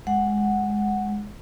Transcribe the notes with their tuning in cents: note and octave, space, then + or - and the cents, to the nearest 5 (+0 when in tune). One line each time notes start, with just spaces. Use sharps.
G#3 +0 F#5 +0